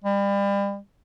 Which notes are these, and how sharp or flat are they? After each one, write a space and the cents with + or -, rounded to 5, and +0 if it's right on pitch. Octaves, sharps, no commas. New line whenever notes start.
G3 +35